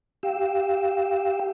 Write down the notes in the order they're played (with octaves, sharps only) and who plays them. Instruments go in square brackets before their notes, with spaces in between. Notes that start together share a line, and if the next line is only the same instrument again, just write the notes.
[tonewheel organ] G4 F5 G5 E6